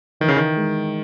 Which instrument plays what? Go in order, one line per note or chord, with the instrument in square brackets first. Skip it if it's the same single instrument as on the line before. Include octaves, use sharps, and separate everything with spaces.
[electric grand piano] D#3 [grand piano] E3
[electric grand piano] C#3
D#3
[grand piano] G#3